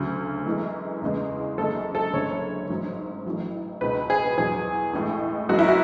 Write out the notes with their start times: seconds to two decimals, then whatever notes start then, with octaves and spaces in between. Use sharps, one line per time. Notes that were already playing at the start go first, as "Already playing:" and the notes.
Already playing: D2 C#3 F#3
0.46 F#2 E3 G#3
1.02 E2 C#3 G#3
1.58 F#1 F#2 D3 G#3 A4
1.95 A4
2.13 F#1 F#2 D3 G#3 C#5
2.70 A1 G#2 F#3
3.26 A1 A2 F#3
3.81 C#2 B2 G#3 B4
4.10 G#4
4.37 E2 B2 F#3 G#4
4.94 A1 A2 G#3
5.49 F#1 F#2 E3 G#3 F#4
5.59 E4
5.68 F#4